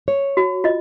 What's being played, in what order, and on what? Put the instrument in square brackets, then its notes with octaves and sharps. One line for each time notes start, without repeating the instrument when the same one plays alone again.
[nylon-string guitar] C#5
[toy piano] F#4
F4 D#5